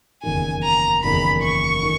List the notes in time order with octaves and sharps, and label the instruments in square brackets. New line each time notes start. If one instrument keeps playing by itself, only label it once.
[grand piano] F#1 E2 D#3 [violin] G#5
[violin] A#5
[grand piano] F#1 E2 D#3 [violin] B5
[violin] C#6
[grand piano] D#3